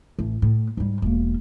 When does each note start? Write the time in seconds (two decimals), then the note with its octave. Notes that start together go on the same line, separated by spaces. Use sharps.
0.19 A1
0.42 A2
0.77 G#2 G3
1.02 E1 A#3